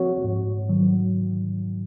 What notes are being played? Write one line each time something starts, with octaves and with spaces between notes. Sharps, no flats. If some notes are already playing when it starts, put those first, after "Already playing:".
Already playing: F3 C4 F#4 C#5
G#2
D#3 F#3